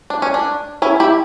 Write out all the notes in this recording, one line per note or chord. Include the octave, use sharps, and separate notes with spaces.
D4
C#4
D4
C#4 E4
E4 G4